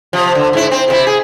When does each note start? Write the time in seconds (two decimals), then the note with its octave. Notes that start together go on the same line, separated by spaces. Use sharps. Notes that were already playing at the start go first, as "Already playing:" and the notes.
0.13 C3 F3
0.35 D3
0.53 G#2 E4
0.71 C4
0.88 C3 B3 E4
1.07 G#4